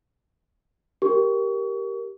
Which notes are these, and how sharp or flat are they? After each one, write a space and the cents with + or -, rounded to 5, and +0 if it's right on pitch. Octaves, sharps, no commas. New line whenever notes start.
G4 +0 A#4 +0 C#6 +30